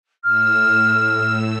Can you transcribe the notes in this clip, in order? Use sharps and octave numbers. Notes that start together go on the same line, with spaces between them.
A2 E6 F6